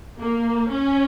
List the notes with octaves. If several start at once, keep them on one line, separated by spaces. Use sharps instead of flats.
A#3
C#4